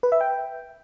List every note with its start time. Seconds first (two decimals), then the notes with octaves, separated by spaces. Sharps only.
0.03 B4
0.12 E5
0.21 G5